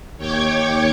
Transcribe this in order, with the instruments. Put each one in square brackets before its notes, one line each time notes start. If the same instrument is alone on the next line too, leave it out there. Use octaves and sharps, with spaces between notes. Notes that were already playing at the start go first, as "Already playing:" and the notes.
[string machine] D#2 C#5 G5 C#6 D6 G#6